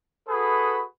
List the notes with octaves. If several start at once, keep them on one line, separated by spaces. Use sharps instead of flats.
F#4 G#4 A4 B4 B5 D#6